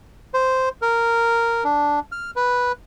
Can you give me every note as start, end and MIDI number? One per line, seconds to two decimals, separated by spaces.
0.34 0.69 72
0.82 1.64 70
1.64 2.00 62
2.12 2.31 89
2.36 2.72 71